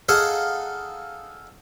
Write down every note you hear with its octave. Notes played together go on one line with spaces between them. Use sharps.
D#4 G#4 A4 F5 F#5